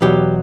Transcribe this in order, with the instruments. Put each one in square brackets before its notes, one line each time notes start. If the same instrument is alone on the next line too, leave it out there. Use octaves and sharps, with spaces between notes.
[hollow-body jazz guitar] E2 B2 F#3 G4